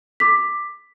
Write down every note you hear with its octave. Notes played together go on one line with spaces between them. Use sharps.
D6 B6